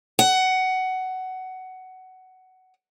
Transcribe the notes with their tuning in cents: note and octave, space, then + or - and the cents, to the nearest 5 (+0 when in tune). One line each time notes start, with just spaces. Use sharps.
F#5 +15